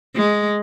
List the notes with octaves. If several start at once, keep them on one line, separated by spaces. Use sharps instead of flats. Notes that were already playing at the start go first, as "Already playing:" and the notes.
G#3